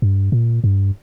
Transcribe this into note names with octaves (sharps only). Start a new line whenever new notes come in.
G2
A#2
G2